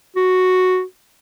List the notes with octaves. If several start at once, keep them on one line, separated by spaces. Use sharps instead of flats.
F#4